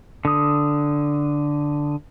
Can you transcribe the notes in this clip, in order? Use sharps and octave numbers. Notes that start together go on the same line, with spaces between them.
D3 D#6